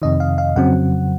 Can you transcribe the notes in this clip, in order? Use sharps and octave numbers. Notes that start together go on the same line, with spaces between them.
F2 C3 D#3 D#5
F5
F5
F2 C#3 F#3 C4 F#5